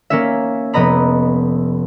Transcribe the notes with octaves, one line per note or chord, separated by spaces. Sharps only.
A#3 C#4 E5
F1 B3 D#5 A#5 B5